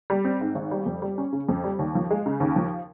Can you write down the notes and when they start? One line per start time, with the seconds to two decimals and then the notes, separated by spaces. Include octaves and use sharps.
0.10 G3
0.25 C4
0.41 G#2
0.55 G#1
0.71 G3
0.86 F2
1.02 G3
1.18 C#4
1.33 C#3
1.49 F2
1.64 G3
1.79 D#2
1.95 F3
2.11 G#3
2.26 C#3
2.40 D#2
2.56 F3